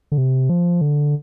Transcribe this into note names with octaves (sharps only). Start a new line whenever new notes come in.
D3
C3
F3
D3